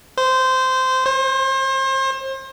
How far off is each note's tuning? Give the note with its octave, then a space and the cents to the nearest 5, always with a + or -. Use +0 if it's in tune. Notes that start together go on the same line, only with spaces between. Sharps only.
C5 -15
C5 +35